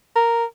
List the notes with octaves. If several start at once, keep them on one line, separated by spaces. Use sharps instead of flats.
A#4